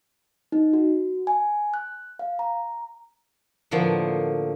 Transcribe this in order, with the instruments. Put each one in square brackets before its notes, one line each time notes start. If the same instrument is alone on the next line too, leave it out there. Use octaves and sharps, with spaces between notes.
[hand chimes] D#4
F#4
G#5
F#6
F5
A#5
[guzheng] A2 D3 F3 A#3 B3